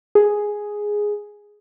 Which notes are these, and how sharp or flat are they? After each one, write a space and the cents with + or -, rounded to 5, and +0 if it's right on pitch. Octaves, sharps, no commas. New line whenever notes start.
G#4 +0